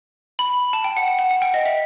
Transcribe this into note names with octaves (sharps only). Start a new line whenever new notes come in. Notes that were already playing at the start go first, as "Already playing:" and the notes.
B5
A5
G5
F#5
F#5
F#5
F#5
G5
D#5
E5